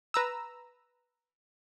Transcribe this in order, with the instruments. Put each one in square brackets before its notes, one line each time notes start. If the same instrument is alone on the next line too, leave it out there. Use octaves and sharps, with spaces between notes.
[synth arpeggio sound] B4 A#5 E6